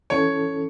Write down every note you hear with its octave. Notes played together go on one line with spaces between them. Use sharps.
E3 C#4 A4 C#5